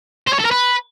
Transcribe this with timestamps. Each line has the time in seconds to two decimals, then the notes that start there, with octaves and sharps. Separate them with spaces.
0.27 C5
0.33 C#5
0.39 A4
0.45 A#4
0.51 B4